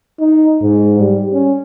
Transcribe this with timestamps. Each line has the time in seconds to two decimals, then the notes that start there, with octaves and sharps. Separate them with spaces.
0.20 D#4
0.61 G#2
0.99 G3
1.33 C#4